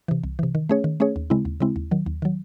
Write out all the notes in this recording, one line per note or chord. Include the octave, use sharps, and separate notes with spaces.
C3 E3
C2
C3 E3
D#3
A3 C#4 G#4 C#5
D#3
A3 C#4 G#4 C#5
D#2
C#3 G#3 C4 E4
D#2
C#3 G#3 C4 E4
D#2
D#3 F#3
D#2
D#3 F#3